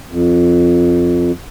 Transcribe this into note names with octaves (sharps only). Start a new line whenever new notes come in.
F2